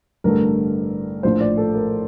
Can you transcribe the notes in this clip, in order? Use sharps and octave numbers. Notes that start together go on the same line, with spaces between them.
A1 G2 D3 A3 A#4
A#1 A2 F3 C5
D5
A4
A#4